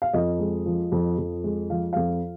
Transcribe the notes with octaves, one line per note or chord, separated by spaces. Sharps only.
F5
F2 D#5
G#3
F3
F2
F2
G#3
F3 F5
F2 F5